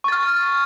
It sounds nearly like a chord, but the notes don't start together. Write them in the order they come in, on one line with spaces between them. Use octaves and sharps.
C#6 A6 F6